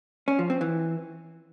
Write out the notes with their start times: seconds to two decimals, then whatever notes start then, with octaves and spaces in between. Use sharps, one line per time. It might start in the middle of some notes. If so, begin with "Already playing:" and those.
0.28 C#4
0.39 F3
0.50 C4
0.61 E3